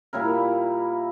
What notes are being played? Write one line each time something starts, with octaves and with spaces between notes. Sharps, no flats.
A#2 G3 E4 A#4